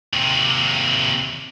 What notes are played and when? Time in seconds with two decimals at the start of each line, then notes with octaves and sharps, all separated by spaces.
0.13 D#2 C3